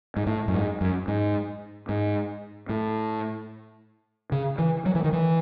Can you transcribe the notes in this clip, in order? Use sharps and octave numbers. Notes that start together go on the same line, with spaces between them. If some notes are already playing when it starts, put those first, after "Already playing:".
G#2
A2
F#2
G#2
F#2
G#2
G#2
A2
C#3
E3
F#3
E3
D#3
E3